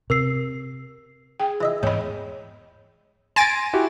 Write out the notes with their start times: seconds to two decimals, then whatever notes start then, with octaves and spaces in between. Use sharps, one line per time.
0.10 C3 A#4 E6 C7
1.40 G#4 G5
1.61 E3 D#5 E5
1.83 E2 G#2 C#5 D#5 G5 B5
3.36 G#5 C6 A6 A#6 D7
3.73 E4 F#4 G4